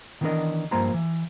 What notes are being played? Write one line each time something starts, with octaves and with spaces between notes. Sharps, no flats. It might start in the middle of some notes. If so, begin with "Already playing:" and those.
D#3 E3 B3 D4 A#4 D#5
G2 F3 A#3 C5 A#5 C6
E3